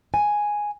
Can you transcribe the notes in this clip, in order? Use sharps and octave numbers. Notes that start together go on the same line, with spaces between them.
G#5